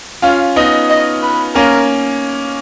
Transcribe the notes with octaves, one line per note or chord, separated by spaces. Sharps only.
C#4 F4 F5
B3 D#4 D#5
D#5
B4
A#3 C#4 A#4